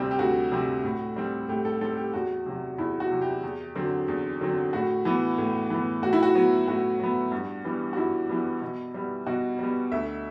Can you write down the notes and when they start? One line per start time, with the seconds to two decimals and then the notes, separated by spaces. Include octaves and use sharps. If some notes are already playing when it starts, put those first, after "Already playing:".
Already playing: D2 C3 G3 C4
0.11 G4
0.19 D2 F#4
0.52 C3 G3 C4
0.84 A2
1.16 G3 C4
1.49 A2 G4
1.65 A4
1.81 G3 C4 A4
1.97 G4
2.14 E2 F#4
2.46 C3 F#3
2.78 E2 E4
3.00 F#4
3.11 C3 F#3
3.21 G4
3.43 E2
3.76 D3 F#3 C4
4.08 E2
4.41 D3 F#3 C4
4.73 A2 F#4
5.05 E3 B3
5.38 A2
5.70 E3 B3
6.02 A2 F#4
6.13 E4
6.23 F#4
6.35 F#3 B3
6.67 A2 F#4
6.99 F#3 B3
7.32 G2
7.65 E3 G3 B3
7.93 F#4
7.97 G2 E4
8.29 E3 G3 B3
8.62 B2
8.94 G3 B3
9.26 B2 F#4
9.59 G3 B3
9.92 D2 E5